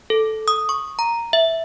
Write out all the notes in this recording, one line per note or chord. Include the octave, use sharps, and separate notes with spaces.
A4
D#6
C#6
A#5
E5